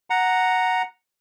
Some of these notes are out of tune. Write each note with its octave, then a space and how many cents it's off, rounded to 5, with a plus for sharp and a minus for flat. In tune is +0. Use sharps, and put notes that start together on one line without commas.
F#5 +0 A#5 +0